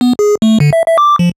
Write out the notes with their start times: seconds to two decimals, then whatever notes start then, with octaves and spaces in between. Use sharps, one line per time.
0.01 B3
0.19 G#4
0.42 A3
0.60 D3
0.73 E5
0.86 E5
0.98 D6
1.19 F3